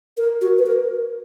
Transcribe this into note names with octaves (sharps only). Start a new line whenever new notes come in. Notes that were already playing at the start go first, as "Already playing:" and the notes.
A#4
F#4
B4
A#4